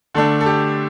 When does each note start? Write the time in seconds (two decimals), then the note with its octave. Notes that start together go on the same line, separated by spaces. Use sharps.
0.15 D3 A3 D4 A4
0.41 A4
0.46 G4